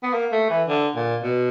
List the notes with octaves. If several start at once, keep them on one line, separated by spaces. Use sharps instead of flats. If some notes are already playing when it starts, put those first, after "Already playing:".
B3
A#3
A3
E3
D3
A#2
B2